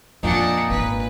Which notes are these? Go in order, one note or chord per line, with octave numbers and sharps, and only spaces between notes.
F2 A#2 D4 D#4 F#5
G#1 D4 B4